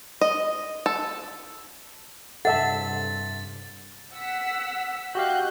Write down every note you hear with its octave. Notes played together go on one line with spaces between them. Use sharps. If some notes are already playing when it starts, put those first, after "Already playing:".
D#5
A4
G2 C3 A4 E5 F#5 A5 A6
F#5 E6 B6
F#4 G4 D#5 F5 F#6 G6